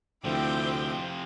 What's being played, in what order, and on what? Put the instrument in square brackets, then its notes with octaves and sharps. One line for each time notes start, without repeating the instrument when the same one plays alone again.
[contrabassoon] D2 [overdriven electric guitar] C3 F3 [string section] C4 G5 [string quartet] E4 D6 G6